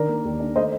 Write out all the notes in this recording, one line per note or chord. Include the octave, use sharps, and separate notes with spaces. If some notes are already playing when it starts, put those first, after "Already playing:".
Already playing: D#3 D4 A#4 D5
A#3
D#2
D4
A3 C5 D#5